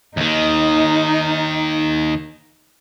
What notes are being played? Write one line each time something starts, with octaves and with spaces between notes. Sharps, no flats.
D#2 D#3 D#4